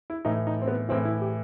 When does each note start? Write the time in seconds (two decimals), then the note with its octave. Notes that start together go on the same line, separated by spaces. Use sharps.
0.10 E4
0.25 A2 E3 D#4
0.47 D#4
0.62 C4
0.68 B3
0.89 A2 E3 C4
1.05 E4
1.21 G4